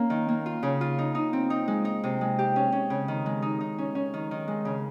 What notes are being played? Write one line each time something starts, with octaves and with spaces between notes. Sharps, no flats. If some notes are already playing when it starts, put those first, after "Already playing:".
Already playing: A#3 C#4
D#3
A#3
F4
C#3
F4
D#4
D#4
C4
D#4
G#3
D#4
C3
G#3
G4
C#4
C#4
C#3
D#3
G#3
D#4
D#4
C#4
C#4
D#3
D#3
G#3
C#3